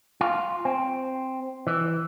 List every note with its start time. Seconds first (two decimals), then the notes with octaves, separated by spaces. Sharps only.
0.21 F4
0.65 C4
1.67 E3